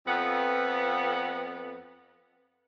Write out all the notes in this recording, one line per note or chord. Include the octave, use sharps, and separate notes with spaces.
F2 B3